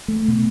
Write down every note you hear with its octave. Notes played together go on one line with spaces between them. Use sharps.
A3
B2